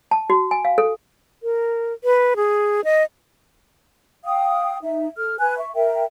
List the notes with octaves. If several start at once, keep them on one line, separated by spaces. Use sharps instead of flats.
A5
F#4
G#5
F5
A4
A#4
B4
G#4
D#5
F5 G5 D#6
D#4 E5
A4 F6
B4 G#5 F#6
E5 C#6
A#4 E5 G5